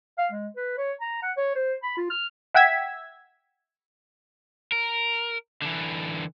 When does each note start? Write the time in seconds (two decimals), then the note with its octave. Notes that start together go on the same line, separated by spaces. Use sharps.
0.18 F5
0.32 G#3
0.56 B4
0.77 C#5
1.01 A#5
1.22 F#5
1.37 C#5
1.55 C5
1.83 B5
1.97 F4
2.10 F6
2.54 E5 F#5 G5 E6 G#6 B6
4.72 A#4
5.62 D3 E3